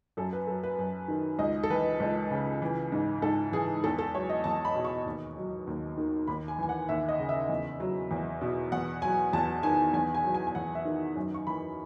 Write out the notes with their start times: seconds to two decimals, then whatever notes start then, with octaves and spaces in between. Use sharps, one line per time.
0.17 F#2 A4
0.33 B4
0.47 F#3 A4
0.63 B4
0.79 F#2
1.08 D#3
1.39 C#2 D#5
1.63 A4
1.70 E3 B4
2.00 C#2
2.31 C#3
2.62 E3
2.92 G#2
3.22 G#2 A4
3.52 E3 G#4
3.84 E2 A4
3.99 A4
4.15 F#3 C#5
4.30 D#5
4.44 E2 A5
4.65 B5
4.75 B2
4.85 C#6
5.06 D#2
5.37 F#3
5.67 D#2
5.98 D#3
6.27 D#2 B5
6.48 G#5
6.59 E3 G#5
6.69 F#5
6.89 D#2 E5
7.09 D#5
7.19 C#3
7.29 E5
7.49 E2
7.80 F#3
8.11 E2
8.41 B2
8.72 E2 F#5
9.02 F#3 G#5
9.33 E2 A5
9.63 D#3 G#5
9.94 E2 G#5
10.14 G#5
10.24 F#3
10.34 G#5
10.47 G#5
10.55 E2 F#5
10.75 E5
10.85 D#3
11.16 F#2
11.34 C#6
11.47 E3 B5